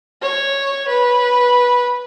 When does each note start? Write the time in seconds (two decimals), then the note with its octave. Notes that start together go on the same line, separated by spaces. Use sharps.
0.22 C#5
0.89 B4